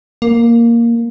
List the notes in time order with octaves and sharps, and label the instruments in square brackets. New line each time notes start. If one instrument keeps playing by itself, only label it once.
[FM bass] A#3